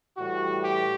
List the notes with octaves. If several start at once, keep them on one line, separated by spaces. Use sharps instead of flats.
A2 E3 G3 F#4
G4